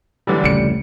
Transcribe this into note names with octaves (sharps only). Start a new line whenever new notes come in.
F#2 D3 E3 G3
F1 C#2 A2 C#7 D7